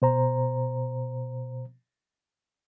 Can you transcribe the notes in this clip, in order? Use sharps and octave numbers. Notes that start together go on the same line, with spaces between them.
B2 C5 A#5